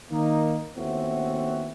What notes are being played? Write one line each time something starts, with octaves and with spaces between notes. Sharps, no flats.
D#3 A#3 D#4
D#2 A2 B3 C4 F#4 E5